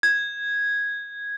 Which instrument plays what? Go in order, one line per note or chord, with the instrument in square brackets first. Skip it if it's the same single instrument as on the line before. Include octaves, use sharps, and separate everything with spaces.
[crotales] G#6